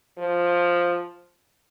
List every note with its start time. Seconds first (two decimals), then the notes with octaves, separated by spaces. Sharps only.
0.18 F3